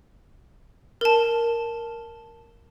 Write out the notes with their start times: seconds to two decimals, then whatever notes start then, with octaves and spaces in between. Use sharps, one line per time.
1.01 A#4 A5